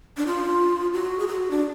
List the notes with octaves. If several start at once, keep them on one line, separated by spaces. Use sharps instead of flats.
D4
F4
F#4
G#4
F#4
D4